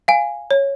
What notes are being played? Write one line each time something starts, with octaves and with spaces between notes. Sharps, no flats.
F5 G#5
C#5